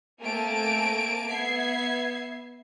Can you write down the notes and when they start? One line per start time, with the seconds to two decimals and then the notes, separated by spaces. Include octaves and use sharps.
0.20 A3 A#3 C4 G#5 A5 D7
1.29 B3 E5 G#6 C7